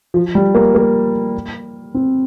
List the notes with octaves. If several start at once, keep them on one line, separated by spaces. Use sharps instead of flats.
F3
G3
A#3
A#3
C4